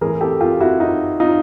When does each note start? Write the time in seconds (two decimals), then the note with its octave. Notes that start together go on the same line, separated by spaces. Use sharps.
0.01 A2 E3 G#4 A#4
0.21 G4 A4
0.41 F4 G4
0.60 E4 F#4
0.80 D#4 F4
1.20 D#4 F4